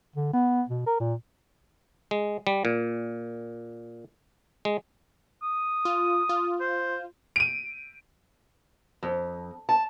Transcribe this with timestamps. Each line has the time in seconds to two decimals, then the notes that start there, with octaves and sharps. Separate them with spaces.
0.16 D3
0.33 B3
0.69 B2
0.86 A#4
1.00 A#2
2.11 G#3
2.47 G3
2.65 A#2
4.65 G#3
5.43 D#6
5.85 F4
6.29 F4
6.60 C5
7.36 D7 D#7
9.03 F2
9.69 A5